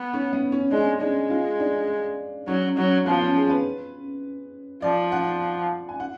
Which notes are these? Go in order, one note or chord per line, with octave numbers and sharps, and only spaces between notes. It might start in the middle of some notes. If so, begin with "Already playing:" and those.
Already playing: B3
C#4
B3
C#4
G#3 D4
G#3 D4
F4
D4
F#3 C#4
F#3 C#4
F3 B3
C#4
G#4
B4
F3 D5
F#5
G#5
F#5